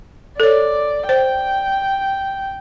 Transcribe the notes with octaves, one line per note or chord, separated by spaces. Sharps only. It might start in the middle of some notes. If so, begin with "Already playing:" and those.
A4 C#5 D5
C5 G5